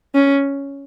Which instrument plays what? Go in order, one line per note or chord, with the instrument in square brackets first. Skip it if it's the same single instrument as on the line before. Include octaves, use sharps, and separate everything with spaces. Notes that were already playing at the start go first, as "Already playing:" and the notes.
[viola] C#4